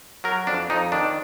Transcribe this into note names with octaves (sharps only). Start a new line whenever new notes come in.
F#3 A#4
F2 D4
F2 D#4
D#3 D4